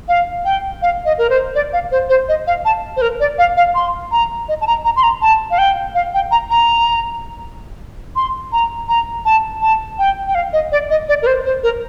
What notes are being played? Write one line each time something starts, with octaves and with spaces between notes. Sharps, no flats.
F5
G5
F5
D#5
A#4
C5
D5
F5
C5
C5
D#5
F5
A5
C5
A#4
D5
F5
F5
C6
A#5
D#5
A5
A#5
A#5
C6
A#5
A5
F5
G5
F5
G5
A#5
A#5
C6
A#5
A#5
A5
A5
G5
G5
F5
D#5
D5
D#5
D5
A#4
C5
C5
A#4